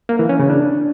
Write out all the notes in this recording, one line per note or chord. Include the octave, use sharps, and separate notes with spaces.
A#3
E3
C#4
C#3
D4